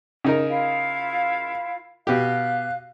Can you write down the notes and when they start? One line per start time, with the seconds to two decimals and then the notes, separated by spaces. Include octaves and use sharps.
0.24 C#3 D#4 A#4
0.47 E4 F4 F5
2.07 B2 G4 F5 F#6